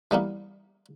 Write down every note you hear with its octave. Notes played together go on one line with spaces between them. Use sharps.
E3 G3 A#3 B3